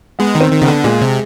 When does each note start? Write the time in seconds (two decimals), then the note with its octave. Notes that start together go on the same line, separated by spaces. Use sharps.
0.19 G#3 B3
0.35 D#3
0.41 C4
0.52 D#3
0.62 C#3 B3
0.68 D3
0.84 A#2 G#3
1.01 C3